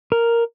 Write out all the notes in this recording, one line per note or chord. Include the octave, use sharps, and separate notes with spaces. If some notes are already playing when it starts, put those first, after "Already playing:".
A#4